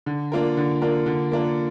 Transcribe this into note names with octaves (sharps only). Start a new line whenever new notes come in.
D3
A#3 D4 F4 A#4
D3
A#3 D4 F4 A#4
D3
A#3 D4 F4 A#4